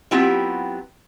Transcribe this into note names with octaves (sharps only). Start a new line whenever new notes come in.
F#3 B3 C4 E4 F4 G4